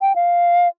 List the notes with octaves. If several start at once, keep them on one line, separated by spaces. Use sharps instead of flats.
G5
F5